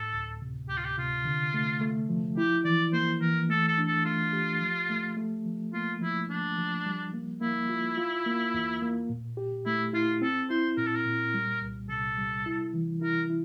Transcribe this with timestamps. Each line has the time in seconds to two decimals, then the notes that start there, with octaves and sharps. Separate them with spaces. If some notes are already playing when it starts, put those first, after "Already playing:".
Already playing: A2 A4
0.13 D2
0.42 C3
0.69 D2 G4
0.77 F4
0.84 G4
0.98 C3 F4
1.25 D3
1.54 A3
1.81 A3
2.09 F3
2.37 E4 G4
2.65 E3 D5
2.93 A#3 C5
3.21 E3 A#4
3.49 A3 A4
3.68 A4
3.78 D4
3.87 A4
4.05 A3 F4
4.33 G4
4.61 F3
4.90 A3
5.17 A3
5.46 F3
5.73 A#3 F4
6.01 F3 E4
6.29 F3 D4
6.58 F3
6.86 G3
7.14 A#3
7.41 A#3 E4
7.70 F4
7.97 F4
8.26 A#3
8.54 E2
8.82 A#3
9.09 A#2
9.37 G4
9.65 A3 E4
9.93 E4 F4
10.22 C4 A4
10.50 E4 C5
10.77 A#2 A#4
10.86 A4
10.95 A#4
11.06 A#2
11.34 G3
11.62 C2
11.89 C3 A4
12.18 G3
12.46 E4
12.74 E3
13.01 E4 A#4
13.30 E4